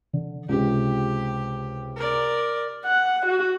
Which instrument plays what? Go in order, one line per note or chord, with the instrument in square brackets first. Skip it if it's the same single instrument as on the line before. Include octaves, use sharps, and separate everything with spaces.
[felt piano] D3
[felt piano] C#2 C3 [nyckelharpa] G4
[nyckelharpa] A#4 D5
[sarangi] F#5
F#4